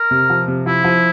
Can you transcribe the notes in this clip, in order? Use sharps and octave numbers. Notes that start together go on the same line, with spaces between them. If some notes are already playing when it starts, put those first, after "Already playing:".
Already playing: A#4
C3
F3
C3
F3 E4
F3